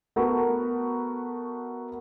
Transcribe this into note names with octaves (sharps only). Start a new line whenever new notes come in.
A3 B3 F#4 A#4